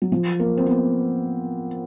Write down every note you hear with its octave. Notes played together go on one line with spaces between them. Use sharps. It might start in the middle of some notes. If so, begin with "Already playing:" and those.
F#3
F3
A#3
C4
B3